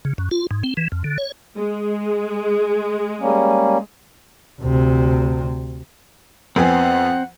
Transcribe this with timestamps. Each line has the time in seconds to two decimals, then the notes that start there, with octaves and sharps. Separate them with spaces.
0.05 C#3
0.18 F#2
0.31 F4
0.51 G#2
0.63 C4
0.77 E3
0.92 F2
1.04 D3
1.18 C#5
1.57 G#3
3.20 G3 A#3 C#4
4.61 D2 C3
6.56 F2 B3 C4 F#5 G#5